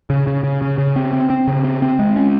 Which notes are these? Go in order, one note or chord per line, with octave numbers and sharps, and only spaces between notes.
C#3
C#3
C#3
C#3
C#3
C4
C4
C4
C#3
C4
C4
G#3
C#4